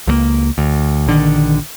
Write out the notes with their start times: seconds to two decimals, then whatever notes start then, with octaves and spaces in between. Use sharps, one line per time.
0.07 C#2 F#3 A#3
0.58 D2
1.07 A#1 D3 D#3